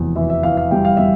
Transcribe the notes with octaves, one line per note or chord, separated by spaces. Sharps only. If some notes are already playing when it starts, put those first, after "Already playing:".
Already playing: F1 E2
E3 E5
E5
E3 F5
F5
G3 G5
F5
G3 E5